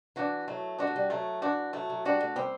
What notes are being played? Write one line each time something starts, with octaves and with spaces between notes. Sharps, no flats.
E3 D4 F#4
F#3 A3
G3 D4 F#4
A3
G3
F#3 A3
E3 D4 F#4
F#3 A3
F#3
G3 D4 F#4
A3
G3 C4